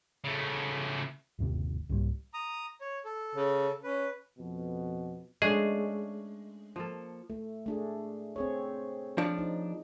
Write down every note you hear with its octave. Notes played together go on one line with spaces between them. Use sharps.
C#3 A3
G1 D#2 C3
C2 G#2 E3 G3
A#5 D#6
C#5
A4
C#3
C#4 B4
F2 B2
G#3 A3 C#4 D4 G#4
F3 A#3 A4
A3
A3 D4 G#4
C4 G#4 C#5
F3 D4
D#4